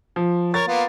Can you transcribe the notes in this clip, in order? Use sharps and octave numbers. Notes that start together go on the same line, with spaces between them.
F3
A#4 C#5 A6
A#3 B3 F4